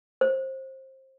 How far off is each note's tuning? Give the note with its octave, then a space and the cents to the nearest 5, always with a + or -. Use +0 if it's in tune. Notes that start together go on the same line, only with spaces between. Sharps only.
C5 +25